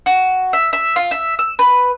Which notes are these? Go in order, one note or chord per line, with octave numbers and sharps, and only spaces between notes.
F#4
E5
E5
F4
E5
E6
B4